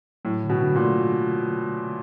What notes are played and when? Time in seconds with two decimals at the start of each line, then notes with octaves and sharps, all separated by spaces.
0.25 A2 F#3
0.43 D3
0.50 B2
0.62 D3
0.76 A#2
0.81 A3